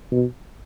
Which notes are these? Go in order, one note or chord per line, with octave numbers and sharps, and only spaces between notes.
B2